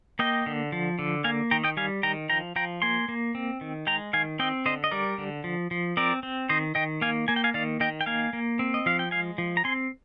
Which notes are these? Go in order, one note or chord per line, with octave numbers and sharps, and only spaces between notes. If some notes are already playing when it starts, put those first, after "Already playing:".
A#3 D#5 G5
D3
F3
D3
A#3 F5 G#5
D#3 G5 A#5
D#5 G5
G3 F5 G#5
D#3 G5 A#5
F3 G5 A#5
F3 G5 A#5
A#3 G#5 C6
A#3
C4
D#3
G#3 G5 A#5
D#3 F5 G#5
C4 D#5 G5
D3 C5 D#5
D#5
G3 A#4 D5
D3
F3
F3
C4 A#4 D5
C4
D#3 C5 D#5
D#3 D#5 G5
A#3 F5 G#5
A#3 G#5
G5
F5 G#5
D#3 D5 F5
D#3 D#5 G5
G5
A#3 F5 G#5
A#3
C4
D#5
F3 F5
G5
G#3 F5 G#5
F3
A#5
C4 G#5 C6